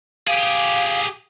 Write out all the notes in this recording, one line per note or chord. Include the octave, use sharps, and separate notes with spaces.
G4 G#4 F5